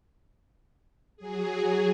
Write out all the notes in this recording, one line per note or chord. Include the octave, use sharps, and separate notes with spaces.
F#3 G#4